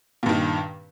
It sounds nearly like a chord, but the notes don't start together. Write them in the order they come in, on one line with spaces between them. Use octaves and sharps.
A#2 G2 D#3